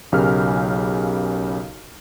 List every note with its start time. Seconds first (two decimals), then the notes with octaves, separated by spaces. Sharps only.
0.12 B1 C#3 G4 A#4 G#5 F6